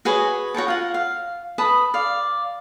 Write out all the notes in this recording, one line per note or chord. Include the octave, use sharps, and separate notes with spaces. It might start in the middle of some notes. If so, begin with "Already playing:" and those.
F#4 G#4 B4 C#5
F#4 C#5 G5 A5
F4 F#5
F5
B4 A5 B5 D#6
D5 F5